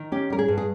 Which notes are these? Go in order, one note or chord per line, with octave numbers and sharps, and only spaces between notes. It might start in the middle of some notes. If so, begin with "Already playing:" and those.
Already playing: D#3
C#4 G4
G3 A#4
G#4
G2
G#4